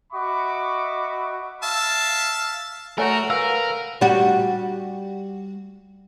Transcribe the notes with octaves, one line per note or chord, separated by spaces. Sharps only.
F#4 D#5 E5 B5 C#6 D6
E5 F5 A5
A3 F#4 A#4 C#5 G#5
A#4 B4 F5 E6
G3 F#4